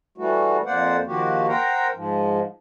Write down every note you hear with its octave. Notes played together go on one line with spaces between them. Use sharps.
E3 G3 A3 F#4
F2 A#3 C5 D5 F#5
D#3 F3 A#3 F#4 G4
A#4 C5 F#5 G5 A#5
G#2 F3